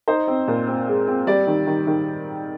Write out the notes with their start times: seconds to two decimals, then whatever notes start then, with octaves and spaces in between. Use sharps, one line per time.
0.08 D#4 C5
0.27 C4
0.48 A#2
0.67 C4
0.87 G#3
1.08 C4
1.27 G3 D5
1.47 D#3
1.67 D#3
1.87 D#3